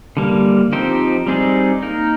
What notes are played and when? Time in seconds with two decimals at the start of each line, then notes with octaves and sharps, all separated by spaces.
0.17 D3 G3 A#3
0.73 F3 C4 D#4 G4 C5
1.27 G3 C4 D#4 G#4 D5
1.82 A#3 D#4 A#4